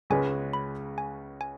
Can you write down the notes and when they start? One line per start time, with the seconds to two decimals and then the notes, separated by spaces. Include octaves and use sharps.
0.10 C#2 C#3 G#3 C#4 B4 G#5
0.53 B5
0.98 G#5
1.41 G#5